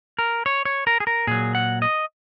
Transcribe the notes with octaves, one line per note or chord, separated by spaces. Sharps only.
A#4
C#5
C#5
A#4
G#4
A#4
A#2 F#3 G#4
F#5
D#5